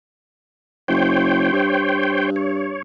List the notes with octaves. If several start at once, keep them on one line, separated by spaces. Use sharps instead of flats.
F#1 C5 C#5 G5
G2
C#5